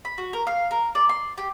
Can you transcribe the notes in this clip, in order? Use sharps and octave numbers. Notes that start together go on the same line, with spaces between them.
B5
F#4
A#4
F5
A#4
D5
C6
G4